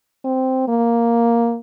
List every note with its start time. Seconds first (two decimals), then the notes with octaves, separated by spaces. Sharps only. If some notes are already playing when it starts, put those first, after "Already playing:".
0.24 C4
0.68 A#3